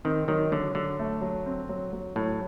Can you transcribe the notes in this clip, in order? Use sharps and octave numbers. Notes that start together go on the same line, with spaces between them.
D#3 C4
D#3 F#3
D3 F#3
D3 F#3
A3
F#3
C4
F#3
F#3
A2 F#3